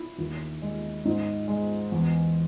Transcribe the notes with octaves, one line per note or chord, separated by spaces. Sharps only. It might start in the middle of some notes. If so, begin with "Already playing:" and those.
Already playing: E4
D#2
G#3
G#2
G#3
E2